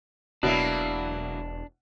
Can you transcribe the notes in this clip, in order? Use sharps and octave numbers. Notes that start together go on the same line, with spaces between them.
E1 B2 F#3 A#3 D4 E4